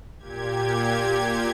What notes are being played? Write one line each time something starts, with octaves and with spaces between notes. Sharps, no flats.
A#2 G4 G#6